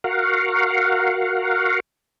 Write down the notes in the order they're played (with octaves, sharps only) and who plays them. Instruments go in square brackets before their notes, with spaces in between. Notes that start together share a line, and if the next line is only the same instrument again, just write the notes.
[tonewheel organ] F#4 A#4 F5 F#5